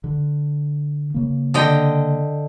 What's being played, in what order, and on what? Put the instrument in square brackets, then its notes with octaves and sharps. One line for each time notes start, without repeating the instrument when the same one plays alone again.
[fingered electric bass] D3
C#3 A#3
[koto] D3 D#5 G5